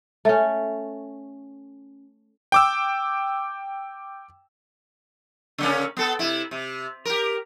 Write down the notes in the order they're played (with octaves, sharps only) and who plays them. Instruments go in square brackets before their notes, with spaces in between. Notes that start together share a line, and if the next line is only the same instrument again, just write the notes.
[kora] A3 C#4
[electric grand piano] G5 D6 E6
[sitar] C#3 A#3 C#4
B3 A4
C3 E4
C3
G4 A#4